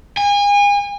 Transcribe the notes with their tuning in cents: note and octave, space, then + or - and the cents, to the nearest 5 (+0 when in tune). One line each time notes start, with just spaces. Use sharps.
G#5 -35